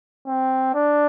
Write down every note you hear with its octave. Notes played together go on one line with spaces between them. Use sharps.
C4
D4